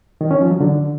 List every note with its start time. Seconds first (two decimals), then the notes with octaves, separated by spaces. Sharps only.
0.21 D#3
0.31 C#4
0.41 F3
0.51 F#3
0.61 D3